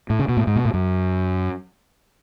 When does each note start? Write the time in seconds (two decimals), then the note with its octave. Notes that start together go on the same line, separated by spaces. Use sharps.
0.10 A2
0.19 C#3
0.29 B2
0.37 A2
0.47 G#2
0.56 B2
0.65 A2
0.74 F#2